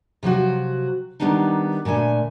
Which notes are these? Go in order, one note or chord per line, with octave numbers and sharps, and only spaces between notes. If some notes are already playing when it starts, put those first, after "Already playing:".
C3 F3 F#3 F#4
D#3 F#3 G3 B3 D4 D#4
A#2 D3 A3 G#5